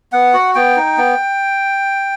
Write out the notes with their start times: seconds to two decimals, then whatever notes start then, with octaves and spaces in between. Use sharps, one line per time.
0.13 B3 F#5
0.34 F#4
0.55 B3 G5
0.76 D#4
0.98 B3